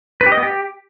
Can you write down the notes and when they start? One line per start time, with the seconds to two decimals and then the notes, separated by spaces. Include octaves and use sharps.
0.21 B4
0.26 G4
0.32 D#5
0.37 B3
0.43 G4